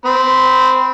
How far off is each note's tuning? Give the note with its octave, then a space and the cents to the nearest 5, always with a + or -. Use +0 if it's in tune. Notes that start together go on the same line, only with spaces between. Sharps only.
C4 -15 B5 +0